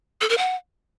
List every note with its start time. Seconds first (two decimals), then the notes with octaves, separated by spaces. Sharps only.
0.21 A4
0.29 A#4
0.38 F#5